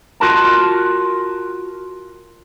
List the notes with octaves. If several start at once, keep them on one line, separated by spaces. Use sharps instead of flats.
F4 F#4 A#4 A5